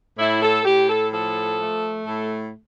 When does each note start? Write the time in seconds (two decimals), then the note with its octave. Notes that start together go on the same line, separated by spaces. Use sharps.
0.19 A2 E4
0.43 A4
0.65 A2 G4
0.89 A4
1.12 F3 A4
1.59 A3
2.06 A2 A4